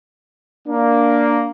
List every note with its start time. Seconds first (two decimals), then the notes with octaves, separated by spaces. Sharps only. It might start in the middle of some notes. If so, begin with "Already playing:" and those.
0.68 A#3 D4